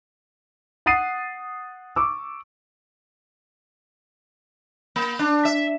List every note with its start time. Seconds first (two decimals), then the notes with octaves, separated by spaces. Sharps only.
0.86 F#5 D#6 A6 C7 D#7
1.96 C#6 D6 E6
4.96 A#3
5.19 D4
5.45 E5